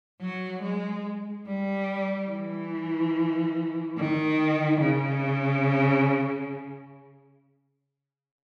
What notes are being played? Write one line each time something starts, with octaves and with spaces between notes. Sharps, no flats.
F#3
G#3
G3
E3
D#3
C#3